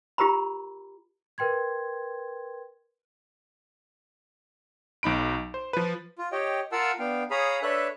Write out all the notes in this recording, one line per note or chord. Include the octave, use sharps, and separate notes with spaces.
F4 G4 A#4 A#5 B5
A#4 B4 G5 C6 G#6
B1 D#4 B5 D7
C5
F3 B4
F4
G4 C#5 D#5 G5
F4 A#4 F5 F#5 A5 E6
B3 D4 F5 G5
G#4 C#5 F5 A#5 B5 D#6
D4 A4 B4 C#5 E5 F#6